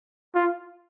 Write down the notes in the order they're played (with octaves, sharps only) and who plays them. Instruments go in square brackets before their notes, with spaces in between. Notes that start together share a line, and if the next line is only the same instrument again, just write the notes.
[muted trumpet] F4